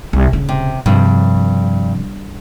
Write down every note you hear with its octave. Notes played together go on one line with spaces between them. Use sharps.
C2
D#1 C#3
C3
G2 C3 F3